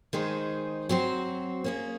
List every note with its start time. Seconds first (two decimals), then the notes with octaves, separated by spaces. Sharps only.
0.13 D#3 G#3 D#4 G#4 C5
0.89 F#3 C4 F#4 C5
1.64 A#3 C#4 G#4